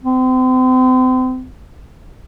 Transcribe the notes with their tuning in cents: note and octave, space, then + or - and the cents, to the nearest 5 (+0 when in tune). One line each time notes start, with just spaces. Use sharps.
C4 -35